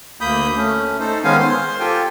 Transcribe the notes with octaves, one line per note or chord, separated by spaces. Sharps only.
D2 A#3 B5 D#6 G6
A3 C#4
D#4 A4 C5
D#3 G#3 B3 C#4 F5 G#5
C5 C6
F4 G4 A4 G5 G#5